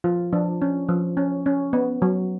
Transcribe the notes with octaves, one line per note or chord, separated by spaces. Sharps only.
F3 F4
F3 D4
C#4
F3
C#4
C#4
B3
F#3